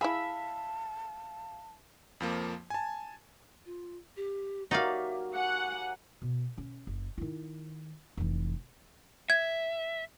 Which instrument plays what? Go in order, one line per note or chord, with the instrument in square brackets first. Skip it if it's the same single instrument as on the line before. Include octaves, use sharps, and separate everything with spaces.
[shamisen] E4 G#4 [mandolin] E5 B5 [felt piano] F5 [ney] A5
[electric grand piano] F2 F3 A#3
G#5 A5
[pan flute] F4
G4
[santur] F#3 A#3 G4 [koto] D#4 D5 F5 [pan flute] E5
[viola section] F#5 [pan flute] G#5
[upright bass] B2
C#4
F#1
D#3 E4
F1 E3
[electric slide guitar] E5 [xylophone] G#6